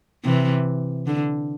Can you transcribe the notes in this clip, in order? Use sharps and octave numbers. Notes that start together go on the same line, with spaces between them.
C3 E3
D3